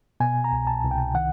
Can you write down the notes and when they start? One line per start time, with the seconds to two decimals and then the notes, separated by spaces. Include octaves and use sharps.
0.20 B2 G#5
0.44 A#5
0.52 C2
0.67 A5
0.84 C2
0.91 G5
1.14 D#3 F#5